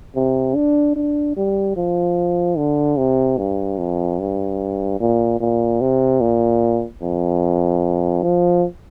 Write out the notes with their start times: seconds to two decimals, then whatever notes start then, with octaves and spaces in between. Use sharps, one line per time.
0.16 C3
0.55 D4
0.96 D4
1.37 G3
1.76 F3
2.57 D3
2.97 C3
3.38 G2
3.78 F2
4.20 G2
5.00 A#2
5.40 A#2
5.81 C3
6.21 A#2
7.02 F2
8.23 F3